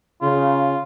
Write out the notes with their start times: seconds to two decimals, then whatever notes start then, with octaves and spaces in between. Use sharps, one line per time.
0.22 C#3 F4